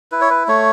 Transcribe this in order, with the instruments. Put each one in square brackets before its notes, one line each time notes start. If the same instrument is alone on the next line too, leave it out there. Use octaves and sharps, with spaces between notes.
[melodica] E4 B4
C#5
B4
A3 C#5